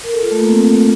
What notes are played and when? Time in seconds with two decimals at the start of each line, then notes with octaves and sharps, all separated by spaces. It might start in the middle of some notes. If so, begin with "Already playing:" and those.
0.04 A#4
0.13 A4
0.23 F4
0.31 A3
0.40 A#3
0.49 C4
0.61 A#3
0.73 A3